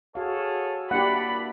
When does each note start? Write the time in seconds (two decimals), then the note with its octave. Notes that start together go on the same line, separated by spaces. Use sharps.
0.15 F#4 G#4 A4 C#5 F5
0.91 A#3 D4 E4 G4 D5 F#5 B5